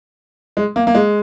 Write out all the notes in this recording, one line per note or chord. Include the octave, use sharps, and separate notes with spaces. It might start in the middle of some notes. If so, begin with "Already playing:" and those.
G#3
A#3
A#3
G#3